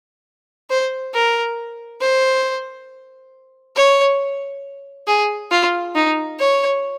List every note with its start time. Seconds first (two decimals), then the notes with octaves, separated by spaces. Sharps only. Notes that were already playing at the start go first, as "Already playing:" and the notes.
0.70 C5
1.14 A#4
2.01 C5
3.76 C#5
5.07 G#4
5.51 F4
5.95 D#4
6.39 C#5